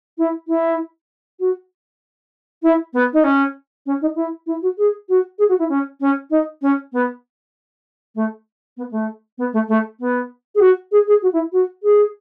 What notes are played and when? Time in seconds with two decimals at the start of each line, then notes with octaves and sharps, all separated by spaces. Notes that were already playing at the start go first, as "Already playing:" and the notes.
0.18 E4
0.48 E4
1.39 F#4
2.63 E4
2.93 B3
3.13 D#4
3.24 C#4
3.86 C#4
4.01 D#4
4.16 E4
4.46 E4
4.62 F#4
4.77 G#4
5.09 F#4
5.38 G#4
5.49 F#4
5.59 E4
5.69 C#4
6.00 C#4
6.30 D#4
6.62 C#4
6.93 B3
8.15 A3
8.77 B3
8.91 A3
9.38 B3
9.53 A3
9.68 A3
10.00 B3
10.55 G#4
10.60 F#4
10.91 G#4
11.07 G#4
11.22 F#4
11.33 E4
11.52 F#4
11.83 G#4